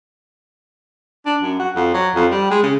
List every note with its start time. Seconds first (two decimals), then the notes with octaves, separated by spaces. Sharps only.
1.26 D4
1.42 F#2
1.60 F#4
1.76 F2
1.94 F#3
2.15 F2
2.31 G3
2.50 G#3
2.63 C#3